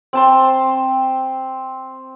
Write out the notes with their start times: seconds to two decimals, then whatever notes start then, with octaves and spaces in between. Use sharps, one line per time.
0.13 C4 A5 C6